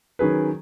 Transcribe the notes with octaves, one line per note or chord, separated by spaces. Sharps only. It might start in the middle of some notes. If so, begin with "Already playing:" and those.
D#3 F#3 C#4 G#4 B4